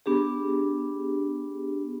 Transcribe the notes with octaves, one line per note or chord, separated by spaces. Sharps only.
B3 D4 G4 G#4